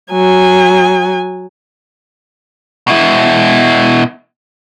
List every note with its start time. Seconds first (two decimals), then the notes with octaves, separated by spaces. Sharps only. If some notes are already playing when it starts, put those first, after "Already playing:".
0.12 F#3 G#5
2.88 B2 E4